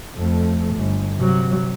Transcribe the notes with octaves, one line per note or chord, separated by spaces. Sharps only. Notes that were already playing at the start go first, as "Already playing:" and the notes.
F2 A3
G1
C3 F#3